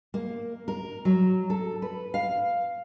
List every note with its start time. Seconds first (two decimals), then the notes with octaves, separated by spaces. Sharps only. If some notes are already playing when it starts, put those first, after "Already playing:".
0.14 A#3
0.68 A#4
1.05 F#3
1.50 A4
1.82 B4
2.14 F5